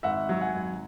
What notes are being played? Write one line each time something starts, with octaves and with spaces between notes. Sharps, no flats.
G#1 E5 F#5
F#3
F#5 G#5
G#1